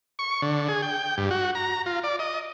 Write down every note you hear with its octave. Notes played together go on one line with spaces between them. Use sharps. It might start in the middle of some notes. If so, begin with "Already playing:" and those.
C#6
D3
G#4
G5
G2
F#4
A#5
F4
D5
D#5